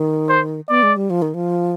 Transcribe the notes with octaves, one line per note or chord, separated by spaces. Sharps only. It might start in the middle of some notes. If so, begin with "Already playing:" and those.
Already playing: D#3
C5
B3 D5
G#3
G3
F3
D#3
F3